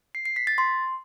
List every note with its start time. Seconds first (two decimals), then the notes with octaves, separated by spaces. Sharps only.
0.15 C7
0.25 C7
0.36 B6
0.47 A6
0.58 C6